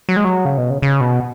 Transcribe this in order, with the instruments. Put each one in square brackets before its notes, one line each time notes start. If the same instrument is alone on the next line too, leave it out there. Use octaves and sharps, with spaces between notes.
[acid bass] F#3
G#3
F#3
C#3
B2
C#3
C#3
B2